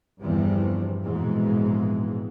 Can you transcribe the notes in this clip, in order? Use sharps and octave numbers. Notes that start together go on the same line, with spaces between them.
G1 E2 C3 E3 F3 G3
A#1 F2 G#2 B2 E3 G#3